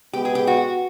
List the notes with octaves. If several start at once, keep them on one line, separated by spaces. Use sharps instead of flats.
B2 G#3 B3 G4
G#4
G4
F#4